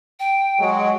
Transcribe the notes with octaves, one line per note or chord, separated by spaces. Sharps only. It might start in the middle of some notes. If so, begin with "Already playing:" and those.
G5
F#3 G#3